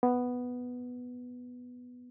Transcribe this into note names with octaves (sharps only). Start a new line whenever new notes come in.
B3